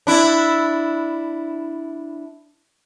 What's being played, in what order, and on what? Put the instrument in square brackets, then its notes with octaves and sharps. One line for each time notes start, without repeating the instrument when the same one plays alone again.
[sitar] D4 E4